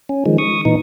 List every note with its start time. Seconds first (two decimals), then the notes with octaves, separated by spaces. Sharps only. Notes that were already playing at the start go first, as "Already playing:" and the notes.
0.09 C#4
0.26 D#3 F3 G#3
0.38 C#6 D#6
0.65 A#2 E3 D#4